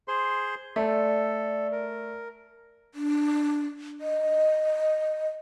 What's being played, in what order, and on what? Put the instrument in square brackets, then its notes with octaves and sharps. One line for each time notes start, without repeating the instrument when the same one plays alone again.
[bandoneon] G#4 C5 C6
[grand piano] A3 [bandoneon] A4 [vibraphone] D5
[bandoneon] A#4
[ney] D4
D#5